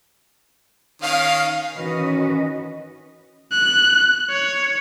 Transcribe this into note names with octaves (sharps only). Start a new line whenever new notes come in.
D#3 C#4 F5
D#3 E3 C#4 F#4 B4 D#5
F#6
C#5